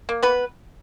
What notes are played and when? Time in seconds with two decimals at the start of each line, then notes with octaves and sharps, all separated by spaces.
0.09 A#3
0.23 B3 B4